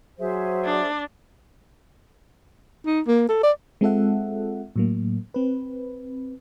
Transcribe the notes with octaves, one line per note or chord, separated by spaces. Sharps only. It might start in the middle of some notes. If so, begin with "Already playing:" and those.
F#3 G#4 C5 E5
D4 D5
D#4
A#3
A4
D5
G#3 C4 F4 A4 E5 F#5
A2 F#3 A#3
C4 B4